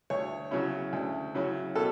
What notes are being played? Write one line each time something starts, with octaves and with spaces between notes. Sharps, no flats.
D2 C#5
C#3 F#3 C#4 E4
D2
C#3 F#3 C#4 E4
B2 A4